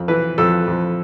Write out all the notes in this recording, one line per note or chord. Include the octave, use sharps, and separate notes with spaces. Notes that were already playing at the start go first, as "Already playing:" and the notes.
Already playing: F2
E3 B4
F2 A4
F2